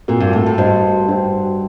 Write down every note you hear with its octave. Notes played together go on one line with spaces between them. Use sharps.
A#2 C4 F#4 A#4
G2
A2
A2
G2 F#4 C5 D#5
D4 F#4 C5 G5